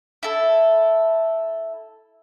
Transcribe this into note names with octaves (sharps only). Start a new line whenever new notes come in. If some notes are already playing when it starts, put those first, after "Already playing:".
E4 A4